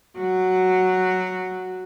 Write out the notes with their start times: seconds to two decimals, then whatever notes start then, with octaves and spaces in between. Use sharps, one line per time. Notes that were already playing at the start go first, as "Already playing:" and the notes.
0.18 F#3 F#4